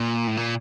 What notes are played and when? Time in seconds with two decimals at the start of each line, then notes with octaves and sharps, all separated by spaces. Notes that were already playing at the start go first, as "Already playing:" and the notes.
Already playing: A#2
0.27 A2
0.37 A#2